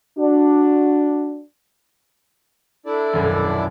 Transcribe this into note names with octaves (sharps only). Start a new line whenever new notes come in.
D4 F#4
D4 E4 A4 D5
D#1 B1 F#2